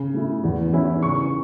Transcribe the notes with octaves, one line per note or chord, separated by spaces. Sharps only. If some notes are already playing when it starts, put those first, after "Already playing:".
Already playing: C#3
A3 E4
E2
E3 C#4 E4
C#3 C#6